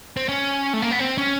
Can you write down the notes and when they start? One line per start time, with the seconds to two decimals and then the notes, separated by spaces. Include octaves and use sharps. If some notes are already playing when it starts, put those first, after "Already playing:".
0.17 C4
0.29 C#4
0.74 A3
0.82 A#3
0.91 B3
0.99 C4
1.18 C#4